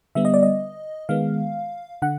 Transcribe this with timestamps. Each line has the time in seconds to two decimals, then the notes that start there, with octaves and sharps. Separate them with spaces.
0.15 D3 G3 B3 E5
0.25 D#5
0.34 D5
0.43 D#5
1.09 D#3 G#3 B3 F5
2.02 D3 F#5